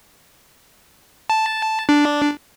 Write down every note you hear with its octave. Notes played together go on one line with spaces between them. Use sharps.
A5
D4